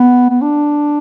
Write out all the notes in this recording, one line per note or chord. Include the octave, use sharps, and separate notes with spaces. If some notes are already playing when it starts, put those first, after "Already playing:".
Already playing: B3
B3
D4